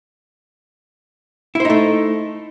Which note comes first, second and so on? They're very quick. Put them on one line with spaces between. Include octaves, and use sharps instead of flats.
E4 C5 D#4 A3